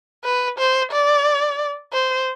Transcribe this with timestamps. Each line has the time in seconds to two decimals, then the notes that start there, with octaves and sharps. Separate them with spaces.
0.24 B4
0.59 C5
0.92 D5
1.93 C5